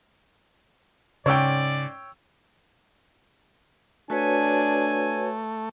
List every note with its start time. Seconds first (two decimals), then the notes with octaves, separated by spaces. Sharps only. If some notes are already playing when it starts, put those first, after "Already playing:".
1.26 G#2 C#3 C#4 C#5 D5 G5 E6
4.10 A3 D4 F#4 B4 C#5 G#5